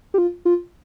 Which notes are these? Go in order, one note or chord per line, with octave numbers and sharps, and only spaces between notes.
G4
F4
F4